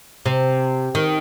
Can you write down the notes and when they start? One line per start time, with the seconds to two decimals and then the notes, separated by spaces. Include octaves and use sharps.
0.26 C3
0.95 D#3